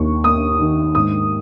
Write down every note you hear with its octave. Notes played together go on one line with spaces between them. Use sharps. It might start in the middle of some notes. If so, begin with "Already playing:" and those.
Already playing: D#2 A#3 C#6
A#3 D#6
D#3
G#2 D#6